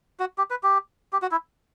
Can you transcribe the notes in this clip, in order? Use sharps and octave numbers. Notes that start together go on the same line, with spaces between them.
F#4
G4
B4
G4
G4
F#4
E4